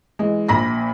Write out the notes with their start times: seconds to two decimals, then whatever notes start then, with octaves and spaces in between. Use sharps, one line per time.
0.19 E3 G#3
0.48 A#1 A#2 B5 A#6